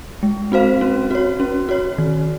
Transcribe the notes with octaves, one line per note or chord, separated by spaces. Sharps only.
G#3
C4 F#4 C5 F5
C#4
F#4 C#5
C#4
F#4 C#5
D#3